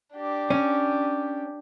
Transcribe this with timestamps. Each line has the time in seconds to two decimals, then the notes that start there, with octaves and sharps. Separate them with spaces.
0.14 D4 G4
0.50 C#4